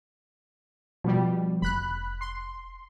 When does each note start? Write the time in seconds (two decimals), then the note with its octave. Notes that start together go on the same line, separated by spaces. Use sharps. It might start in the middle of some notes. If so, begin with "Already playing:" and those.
1.04 B2 F3 G3
1.62 F1 B5 F#6
2.21 C6